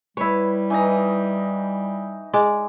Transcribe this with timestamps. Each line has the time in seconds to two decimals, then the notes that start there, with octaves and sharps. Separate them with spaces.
0.17 G3 E4 B4 C#5
0.70 E3 D#4 A#5
2.33 G#3 D5